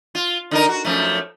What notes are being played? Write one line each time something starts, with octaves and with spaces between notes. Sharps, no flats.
F4
D3 D#4 A#4
F#4
F#2 F3 A3